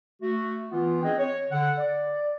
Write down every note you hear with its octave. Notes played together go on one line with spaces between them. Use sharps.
A3 F#4
E3 B3 F4
C4 D4 G#4 D#5 G5
C#5
D3 F#5
D5